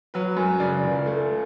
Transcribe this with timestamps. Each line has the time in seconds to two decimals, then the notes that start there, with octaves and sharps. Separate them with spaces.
0.14 F#3 B4
0.37 F#2
0.60 C#3 D5
0.83 C#2
1.06 A3